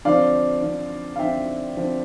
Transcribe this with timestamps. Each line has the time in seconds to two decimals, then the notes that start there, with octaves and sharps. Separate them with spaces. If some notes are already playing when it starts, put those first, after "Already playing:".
0.05 D3 F3 C4 D5 F5
0.62 D3 F3 C4
1.16 F5
1.19 D3 F3 C4 E5 G5
1.76 D3 F3 C4